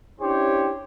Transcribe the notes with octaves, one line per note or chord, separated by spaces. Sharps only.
C#4 D4 E4 G4 C5 C#5